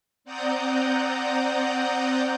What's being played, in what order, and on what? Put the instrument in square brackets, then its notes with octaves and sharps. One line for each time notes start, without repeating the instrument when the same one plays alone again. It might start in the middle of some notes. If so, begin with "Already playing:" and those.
[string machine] C4 D5 F#5 A#5 D#6 G6